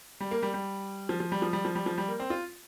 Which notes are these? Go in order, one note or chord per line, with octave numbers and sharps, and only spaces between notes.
G3
A#3
G3
G3
F3
F3
G3
F3
G3
F3
G3
F3
G3
A#3
C4
F4